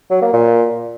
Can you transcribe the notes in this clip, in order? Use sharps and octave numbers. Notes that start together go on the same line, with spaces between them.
F#3
A#3
A#2